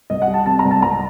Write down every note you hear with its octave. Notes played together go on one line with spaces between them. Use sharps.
C2 D#5
F#5
G3
A5
C3 A5
A#5
C2
A5
C2 A#5